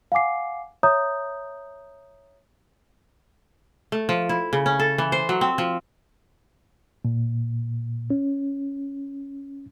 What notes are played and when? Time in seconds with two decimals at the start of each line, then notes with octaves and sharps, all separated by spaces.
0.12 F5 F#5 G#5 D6 C7
0.83 C#5 E5 A#5 D#6 G6
3.92 A3
4.09 F3
4.29 E4
4.53 C#3
4.66 C#4
4.79 A4
4.98 E3
5.12 C5
5.29 F#3
5.41 C4
5.58 F3
7.05 A#2
8.10 C#4